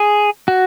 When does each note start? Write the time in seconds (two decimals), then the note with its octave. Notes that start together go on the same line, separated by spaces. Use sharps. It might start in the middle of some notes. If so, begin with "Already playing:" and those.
Already playing: G#4
0.48 F#4